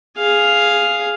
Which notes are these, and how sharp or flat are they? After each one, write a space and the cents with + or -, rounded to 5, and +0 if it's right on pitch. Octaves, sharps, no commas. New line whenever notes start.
G#4 +0 F5 +0